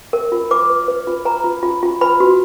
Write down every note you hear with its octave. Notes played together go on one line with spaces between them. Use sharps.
A#4
F4
B4 D6
B4
B4
F4
B4 A#5
F4
F4
F4
B4 B5
F#4